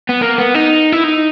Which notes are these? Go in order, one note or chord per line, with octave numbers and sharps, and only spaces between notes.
B3
A#3
B3
D#4
E4
D#4